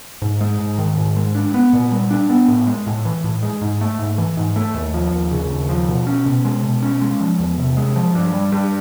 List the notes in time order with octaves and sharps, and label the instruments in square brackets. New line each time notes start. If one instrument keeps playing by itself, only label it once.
[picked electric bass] G#2
G#3
G#2
D#3
G#2
G#3
D4
B3
A#2
G3
D4
B3
A2
G#3
A2
E3
A2
G#3
G#2
A3
G#2
E3
G#2
A3
D#2
F3
D#2
C#3
D#2
F3
B2
C#4
B2
G#3
B2
C#4
G#3
F3
E2
C3
G#3
F3
G2
G3
G2